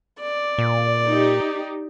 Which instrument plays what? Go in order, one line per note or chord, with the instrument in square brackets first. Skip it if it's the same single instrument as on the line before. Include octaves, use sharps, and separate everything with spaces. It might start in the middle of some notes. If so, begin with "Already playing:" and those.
[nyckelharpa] D5
[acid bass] A#2
[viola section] D#4 G4